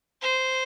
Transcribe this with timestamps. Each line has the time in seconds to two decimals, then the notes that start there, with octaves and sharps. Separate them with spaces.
0.22 C5